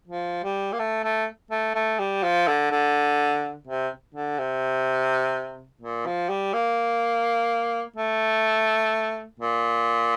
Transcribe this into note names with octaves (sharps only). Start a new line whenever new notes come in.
F3
G3
A#3
A3
A3
A3
A3
G3
F3
D3
D3
C3
D3
C3
A#2
F3
G3
A#3
A3
A#2